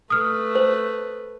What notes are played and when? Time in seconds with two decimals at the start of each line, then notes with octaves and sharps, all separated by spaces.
0.10 A3 B4 D#6 F6
0.55 C5